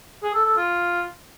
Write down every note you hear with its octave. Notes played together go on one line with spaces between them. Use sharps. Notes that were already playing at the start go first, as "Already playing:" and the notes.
G#4
A4
A4
F4